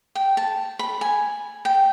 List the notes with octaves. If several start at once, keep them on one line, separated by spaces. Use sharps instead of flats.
G5
A5
B5
G#5
G5